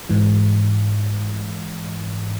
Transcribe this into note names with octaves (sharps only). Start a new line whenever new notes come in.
G#2 E3